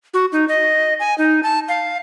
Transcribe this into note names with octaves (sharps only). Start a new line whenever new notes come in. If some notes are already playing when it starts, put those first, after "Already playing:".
F#4
D#4
D#5
G#5
D#4
A5
F5